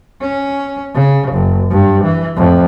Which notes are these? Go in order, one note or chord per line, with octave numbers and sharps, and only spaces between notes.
C#4
C#3
F#1
G2
E3
F2 A2